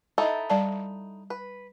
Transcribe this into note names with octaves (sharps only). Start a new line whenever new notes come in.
D#4 E4 A4 D#5 E5
G3 D5 A5
B4